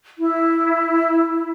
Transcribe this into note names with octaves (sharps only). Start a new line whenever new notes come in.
E4